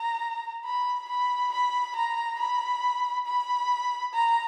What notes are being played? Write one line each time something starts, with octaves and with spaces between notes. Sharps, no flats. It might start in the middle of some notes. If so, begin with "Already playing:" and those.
Already playing: A#5
B5
B5
B5
A#5
B5
B5
A#5